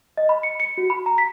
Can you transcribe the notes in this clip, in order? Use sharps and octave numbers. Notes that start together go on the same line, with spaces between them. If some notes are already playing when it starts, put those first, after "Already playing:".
D#5
B5
C#7
C#7
F#4
B5
A#5
B6